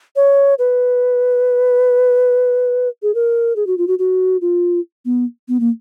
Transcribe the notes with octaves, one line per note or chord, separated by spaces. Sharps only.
C#5
B4
G#4
A#4
G#4
F#4
F4
F#4
F#4
F4
B3
B3
A#3